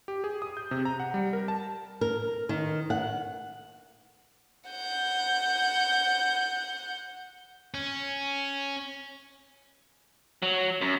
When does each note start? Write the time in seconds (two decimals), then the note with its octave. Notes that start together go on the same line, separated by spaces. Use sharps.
0.08 G4
0.24 G#4
0.42 D#6
0.57 G6
0.71 C3
0.85 A#5
1.00 F#5
1.14 G3
1.33 A#4
1.48 A5
2.01 A#4
2.49 D#3
2.90 F#5
4.70 F#5 G6
7.74 C#4
10.42 F#3
10.81 F#2